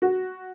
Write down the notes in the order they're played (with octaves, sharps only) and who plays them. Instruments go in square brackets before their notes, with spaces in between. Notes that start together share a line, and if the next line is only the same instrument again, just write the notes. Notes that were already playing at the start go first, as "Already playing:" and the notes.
[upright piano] F#4